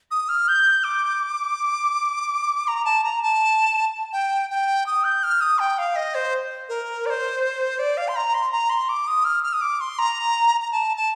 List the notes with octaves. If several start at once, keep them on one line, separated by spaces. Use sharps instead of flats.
D#6
F6
G6
D6
A#5
A5
A#5
A5
G5
G5
D#6
G6
F6
D#6
G5
F5
D#5
C5
A#4
D5
C5
D5
F5
C6
A#5
C6
A#5
C6
D6
D#6
F6
F6
D#6
D6
C6
A#5
A#5
A5
A5